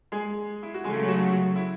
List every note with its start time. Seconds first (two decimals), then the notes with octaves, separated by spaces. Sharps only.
0.12 G#3 G#4
0.63 E4
0.74 F#4
0.84 C#3 F#3 G#3 A3 G#4
1.04 G#4
1.08 F#4
1.33 F#4
1.56 E4